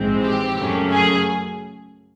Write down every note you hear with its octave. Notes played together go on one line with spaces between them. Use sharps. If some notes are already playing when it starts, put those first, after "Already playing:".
Already playing: A#1 G#2 E3 G#3 C4
G4
F#2 C#3 F#3 A3 C#4
G#4